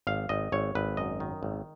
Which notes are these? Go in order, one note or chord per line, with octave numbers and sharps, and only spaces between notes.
G#1 F5
G#1 D#5
G#1 C#5
G#1 B4
F#2 D#5
D#3
G#1